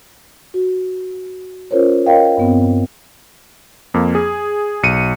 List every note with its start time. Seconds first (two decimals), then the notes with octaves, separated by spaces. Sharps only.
0.54 F#4
1.71 C#4 F4 A#4 C5 C#5
2.06 A#4 C#5 D#5 F5 G5
2.37 G2 B3 C4
3.94 F2 A#3
4.15 G#4
4.83 B1 C#7 D#7